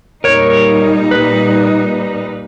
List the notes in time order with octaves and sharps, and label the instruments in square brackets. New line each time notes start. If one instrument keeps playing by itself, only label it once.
[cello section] A#2 G3 D#4 [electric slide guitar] A#4 C#5
[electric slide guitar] B4